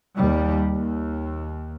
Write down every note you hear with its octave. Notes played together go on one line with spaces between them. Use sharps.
D#2 G3
D#2